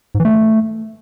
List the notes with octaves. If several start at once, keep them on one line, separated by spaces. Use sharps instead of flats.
G#2
E3
A3